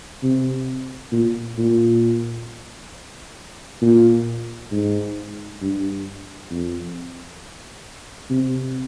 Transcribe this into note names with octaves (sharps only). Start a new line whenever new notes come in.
C3
A#2
A#2
A#2
G#2
G2
F2
C3